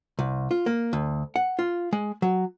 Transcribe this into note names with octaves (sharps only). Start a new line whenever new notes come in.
C2
F4
A#3
D2
F#5
F4
G#3
F#3